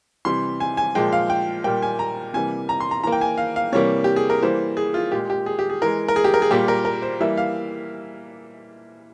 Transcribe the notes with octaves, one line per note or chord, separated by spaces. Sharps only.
C3 E3 G3 C6
G#5
G#5
A#2 F3 G#3 G5
F5
G5
A#2 G3 A#3 G5
G#5
A#5
C3 E3 G3 A#3 G#5
A#5
C6
A#5
E3 A#3 A#5
G5
G#5
F5
F5
C3 E3 G3 A#3 C#5
G4
G#4
A#4
E3 G3 A#3 C5
G#4
F4
A#2 G#3 G4
G4
G#4
G4
G#4
E3 G#3 A#4
A#4
G#4
G4
A#4
G#4
A#2 G3 A#3 G4
A#4
A#4
C5
E3 G3 A#3 E5
F5